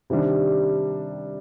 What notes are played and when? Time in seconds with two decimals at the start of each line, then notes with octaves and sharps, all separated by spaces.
0.10 C3 D#3 G3 D4